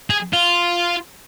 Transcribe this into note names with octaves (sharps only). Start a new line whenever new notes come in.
G#4
F4